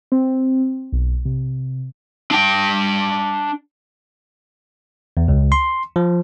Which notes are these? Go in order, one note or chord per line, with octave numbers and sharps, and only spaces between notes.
C4
B1
C3
D4 G5
E2
C#2
C6
F3